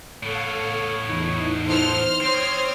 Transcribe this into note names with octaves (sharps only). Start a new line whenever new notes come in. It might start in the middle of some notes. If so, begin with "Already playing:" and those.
A2 B3 A4 C#5 F5
E2 D#4 E4
A4 C5 F6
C4 C#5 C6 D#6 G#6